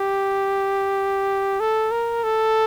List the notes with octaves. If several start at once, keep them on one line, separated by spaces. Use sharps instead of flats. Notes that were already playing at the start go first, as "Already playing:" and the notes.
Already playing: G4
A4
A#4
A4